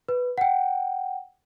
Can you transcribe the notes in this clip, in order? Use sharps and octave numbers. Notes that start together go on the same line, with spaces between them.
B4
F#5 G5